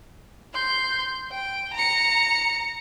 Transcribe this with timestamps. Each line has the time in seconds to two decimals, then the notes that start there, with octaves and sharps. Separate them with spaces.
0.54 C6 G6
1.31 G5
1.74 A#5 C#7